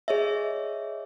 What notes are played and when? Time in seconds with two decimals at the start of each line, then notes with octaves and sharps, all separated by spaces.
0.08 G#4 C#5 D#5 E5